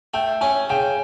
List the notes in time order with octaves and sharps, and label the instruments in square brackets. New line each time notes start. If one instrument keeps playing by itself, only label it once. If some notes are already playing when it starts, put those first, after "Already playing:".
[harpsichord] A3 [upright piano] G5
[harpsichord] C#4 [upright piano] G#5
[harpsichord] C#3 [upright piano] G5